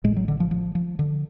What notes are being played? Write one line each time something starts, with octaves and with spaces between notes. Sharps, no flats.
A1 A2 G#3
F#3
D3
F3
F3
F3
D3